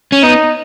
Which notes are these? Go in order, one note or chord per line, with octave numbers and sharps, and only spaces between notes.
C#4
B3 D#4